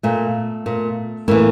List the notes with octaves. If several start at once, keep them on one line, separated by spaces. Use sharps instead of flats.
A#2 A3
A#2
A2 E3 A#3